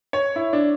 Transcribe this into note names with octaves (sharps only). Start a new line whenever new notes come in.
C#5
E4
D4